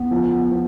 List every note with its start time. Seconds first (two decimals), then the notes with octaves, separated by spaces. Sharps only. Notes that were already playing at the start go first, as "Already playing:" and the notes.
Already playing: E2 B3
0.11 F3
0.52 F3